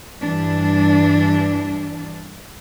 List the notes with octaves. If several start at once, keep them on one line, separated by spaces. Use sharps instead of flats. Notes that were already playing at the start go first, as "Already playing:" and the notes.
G2 E3 G3 D4